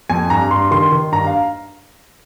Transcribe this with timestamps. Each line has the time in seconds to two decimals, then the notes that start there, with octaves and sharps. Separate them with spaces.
0.10 F2 G#5
0.30 G2 A#5
0.51 G2 C6
0.71 D#3 C6
0.92 D#3
1.12 G2 A#5
1.27 F5